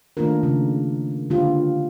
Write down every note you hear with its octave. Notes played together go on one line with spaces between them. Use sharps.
D#3 A3 A#3 D4 F4 A#4
C#3
D3 G#3 A#3 F4 G4